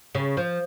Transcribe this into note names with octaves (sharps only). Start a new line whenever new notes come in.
C#3
F3